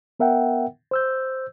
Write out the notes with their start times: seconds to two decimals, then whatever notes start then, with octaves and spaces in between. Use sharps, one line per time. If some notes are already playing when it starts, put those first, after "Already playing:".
0.20 B3 A#4 E5 F#5 G5
0.91 C5 E6 G6